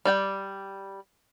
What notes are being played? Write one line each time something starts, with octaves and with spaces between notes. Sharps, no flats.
G3 D5 G5